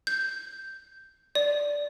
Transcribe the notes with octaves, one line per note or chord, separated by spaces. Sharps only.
G6
D5